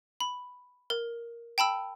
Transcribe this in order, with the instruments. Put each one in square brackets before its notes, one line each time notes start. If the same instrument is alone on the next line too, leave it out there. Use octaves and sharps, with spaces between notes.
[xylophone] B5
A#4
G5 A5 B5 E6